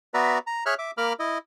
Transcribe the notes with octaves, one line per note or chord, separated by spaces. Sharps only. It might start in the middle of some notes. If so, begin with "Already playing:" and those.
B3 F#4 B4 D5 E5 A#5
A#5
G#4 C#5 E5 F6 F#6
E5 D6
A#3 A#4 B5 D6 F6
E4 D#5